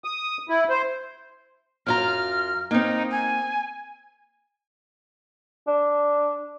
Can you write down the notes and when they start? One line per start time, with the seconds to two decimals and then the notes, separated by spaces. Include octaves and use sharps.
0.04 D#6
0.49 E4
0.70 C5
1.87 F#2 F4 A#5 F6
2.71 A#3 C4 D#4
3.11 G#5
5.67 D4